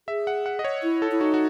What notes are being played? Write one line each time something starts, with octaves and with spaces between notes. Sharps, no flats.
G#4 E5
F#5
F#5
D#5
C#5
E4
A4
E4
D#4 F#4
F#4